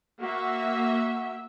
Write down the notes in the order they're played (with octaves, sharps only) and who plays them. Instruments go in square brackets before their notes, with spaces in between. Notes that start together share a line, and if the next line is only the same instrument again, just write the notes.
[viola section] A#3 E5 [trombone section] F#4